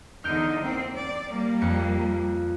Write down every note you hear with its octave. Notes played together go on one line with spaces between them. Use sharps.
E2 D3 D#4 F6 G6 D7
A#3 C4
D5
G3 A#3
F2 C#7